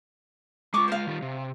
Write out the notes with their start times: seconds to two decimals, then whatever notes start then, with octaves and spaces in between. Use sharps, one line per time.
0.74 G#3 F4 C#6 D6
0.88 C5 F5
1.07 D#3 G3 F4
1.22 C3